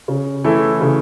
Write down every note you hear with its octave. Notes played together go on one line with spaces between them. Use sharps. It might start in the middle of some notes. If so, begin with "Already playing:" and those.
C#3
E3 A3 E4
C#3